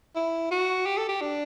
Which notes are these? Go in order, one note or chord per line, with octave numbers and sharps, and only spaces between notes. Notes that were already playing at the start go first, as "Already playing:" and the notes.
E4
F#4
G4
A4
G4
D4